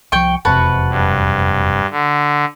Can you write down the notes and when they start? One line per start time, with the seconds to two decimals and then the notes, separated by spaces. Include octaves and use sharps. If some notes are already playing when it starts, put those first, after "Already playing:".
0.12 C2 F3 G5 C#6
0.45 E1 F2 C3 F#4 B4 A5
0.90 G2
1.91 D3